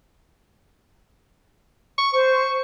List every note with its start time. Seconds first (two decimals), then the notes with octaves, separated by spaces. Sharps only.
1.98 C#6
2.13 C5 C#6